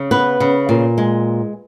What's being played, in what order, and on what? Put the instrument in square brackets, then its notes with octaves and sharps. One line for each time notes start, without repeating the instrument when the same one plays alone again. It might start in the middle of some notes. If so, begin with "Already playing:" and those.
Already playing: [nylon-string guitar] C#3
B3 B4
C#3
A#2
G#3